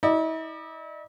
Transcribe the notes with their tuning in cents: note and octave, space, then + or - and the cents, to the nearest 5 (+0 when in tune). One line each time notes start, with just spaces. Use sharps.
E4 -45 D5 +40